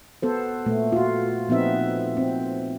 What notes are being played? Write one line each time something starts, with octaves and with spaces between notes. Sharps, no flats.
B3 A4 C5
A#2 A3
F4 F#4
A#2 F3 B3 C4 D#4 E5
C4